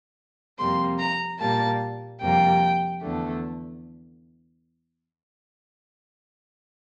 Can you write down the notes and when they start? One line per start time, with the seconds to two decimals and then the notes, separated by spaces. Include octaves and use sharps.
0.58 F2 C3 G3 A#3 C6
0.99 A#5
1.39 A#2 G3 A#3 A5
2.20 F2 C3 G3 A#3 G5
3.02 E2 D3 A3